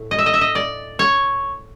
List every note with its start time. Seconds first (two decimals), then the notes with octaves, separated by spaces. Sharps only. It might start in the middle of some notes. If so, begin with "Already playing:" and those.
Already playing: A2
0.11 D#5
0.19 E5
0.26 D#5
0.34 E5
0.41 D#5
0.55 D5
0.99 C#5